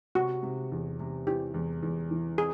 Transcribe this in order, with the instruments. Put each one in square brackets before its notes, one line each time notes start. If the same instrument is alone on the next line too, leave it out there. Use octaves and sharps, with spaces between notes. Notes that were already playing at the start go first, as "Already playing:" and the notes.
[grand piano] C3 [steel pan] F#4
[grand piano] C3
E2
C3
[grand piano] E3 [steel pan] G4
[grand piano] E2
E2
E3
[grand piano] C4 [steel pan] G#4